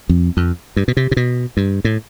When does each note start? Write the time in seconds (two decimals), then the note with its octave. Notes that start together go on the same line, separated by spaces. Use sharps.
0.09 F2
0.37 F2
0.76 G2
0.88 B2
0.97 C3
1.11 C3
1.17 B2
1.57 G2
1.85 A2